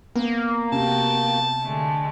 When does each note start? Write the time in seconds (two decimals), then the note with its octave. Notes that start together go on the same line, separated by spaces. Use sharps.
0.16 A#3 B3
0.72 C3 B3 F#4 G5 A5
1.63 D3 G#3 A3